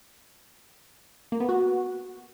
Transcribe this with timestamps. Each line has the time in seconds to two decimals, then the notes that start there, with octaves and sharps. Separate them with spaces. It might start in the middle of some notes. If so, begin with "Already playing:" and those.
1.32 A#3
1.40 B3
1.49 F#4